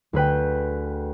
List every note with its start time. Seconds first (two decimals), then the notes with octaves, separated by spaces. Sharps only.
0.13 D2 G#4 B4 G5